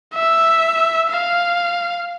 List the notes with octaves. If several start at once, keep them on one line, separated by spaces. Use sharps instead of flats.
E5
F5